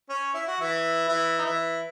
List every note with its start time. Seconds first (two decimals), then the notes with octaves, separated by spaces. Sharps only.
0.10 C#4
0.34 E4
0.48 F#4
0.61 E3 E4
1.08 E3 E4
1.38 D#4
1.45 E3 E4